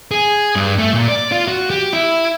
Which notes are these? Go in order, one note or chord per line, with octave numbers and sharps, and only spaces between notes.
G#4
G2
A3
A#2
D5
F4
F#4
G4
E4